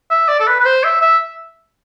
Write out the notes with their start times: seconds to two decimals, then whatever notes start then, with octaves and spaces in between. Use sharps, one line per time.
0.11 E5
0.28 D5
0.40 A4
0.47 B4
0.60 B4
0.65 C5
0.84 E5
1.01 E5